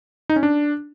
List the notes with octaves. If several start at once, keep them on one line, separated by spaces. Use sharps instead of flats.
D#4
C#4
D4